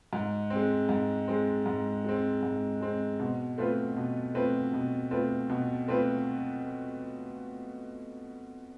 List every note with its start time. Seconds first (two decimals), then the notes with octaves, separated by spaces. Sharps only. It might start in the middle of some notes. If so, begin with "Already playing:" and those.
0.13 G#2
0.50 C4
0.55 G#3
0.89 G#2
1.28 G#3 C4
1.66 G#2
2.04 G#3 C4
2.43 G#2
2.81 G#3 C4
3.19 B2
3.58 A3 C4 F4 B4
3.96 B2
4.34 A3 C4 F4 B4
4.73 B2
5.11 A3 C4 F4 B4
5.49 B2
5.88 A3 C4 F4 B4